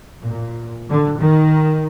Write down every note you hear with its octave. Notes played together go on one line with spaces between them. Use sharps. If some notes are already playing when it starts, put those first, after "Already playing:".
A#2
D3
D#3